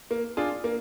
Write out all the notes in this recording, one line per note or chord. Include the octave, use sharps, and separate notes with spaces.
A#3
D4 F4 G#4
A#3